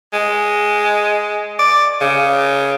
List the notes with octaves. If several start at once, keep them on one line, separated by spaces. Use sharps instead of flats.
G#3
D5
C#3